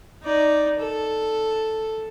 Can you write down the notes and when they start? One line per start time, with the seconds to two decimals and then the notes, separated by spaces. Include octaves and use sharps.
0.23 D#4 D5
0.79 A4